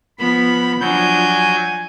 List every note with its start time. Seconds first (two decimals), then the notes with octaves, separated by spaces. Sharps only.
0.19 F3 B3 B5
0.80 F3 F#3 D4 G#5 G6